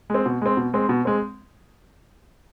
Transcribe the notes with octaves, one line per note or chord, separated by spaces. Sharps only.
G#3 C4
B2
G#3 C4
B2
G#3 C4
B2
G#3 C4